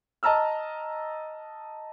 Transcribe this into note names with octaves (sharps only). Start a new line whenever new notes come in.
D#5 A5 A#5 E6 F6